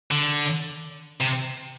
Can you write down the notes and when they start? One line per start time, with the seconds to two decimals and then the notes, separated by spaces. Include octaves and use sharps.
0.11 D3
1.21 C3